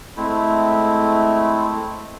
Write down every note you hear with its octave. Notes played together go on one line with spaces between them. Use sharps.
G#3 A3 C4 E4